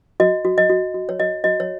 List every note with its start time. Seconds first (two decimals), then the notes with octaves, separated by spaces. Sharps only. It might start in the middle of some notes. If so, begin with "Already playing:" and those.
0.20 F#4 D#5
0.45 F#4
0.58 D#5
0.70 F#4
0.94 F#4
1.09 C#5
1.20 F#4 D#5
1.44 F#4 D#5
1.60 C#5